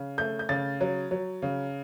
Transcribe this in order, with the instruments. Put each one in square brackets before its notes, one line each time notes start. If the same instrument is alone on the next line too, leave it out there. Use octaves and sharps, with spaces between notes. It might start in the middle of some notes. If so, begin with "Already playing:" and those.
Already playing: [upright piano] C#3
A3 G6
G6
C#3 A6
F#3
F#3
C#3